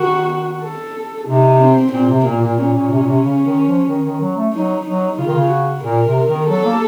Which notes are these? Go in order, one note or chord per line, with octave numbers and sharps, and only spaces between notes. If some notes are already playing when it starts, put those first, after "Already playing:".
Already playing: D#3 F#4
A4
C3 D#4
C4
A#2 C4
C3
A#2 A#3
A#2
A#2 C#4
A#2
C3
A#2
C3
C#3
D#3
F3
D#3
D#3
F#3
A3
F#3 D#4
F#3 D#4
C#3 F4
D#3
C#3
F#4
A#2 A#4
C3
D#3
F#3 A4
A#3